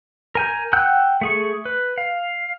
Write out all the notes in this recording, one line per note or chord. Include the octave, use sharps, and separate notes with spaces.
A#4 G#5 G6
F#5 G5 E6 F#6 G6
A3 G#4 C#6
B4
F5